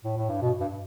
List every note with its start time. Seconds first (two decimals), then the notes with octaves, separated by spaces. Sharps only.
0.04 A2
0.17 A2
0.29 G2
0.42 B2
0.60 G2